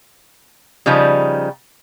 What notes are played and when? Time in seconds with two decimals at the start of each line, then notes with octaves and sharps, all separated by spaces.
0.86 C#3 F3 G3 D#4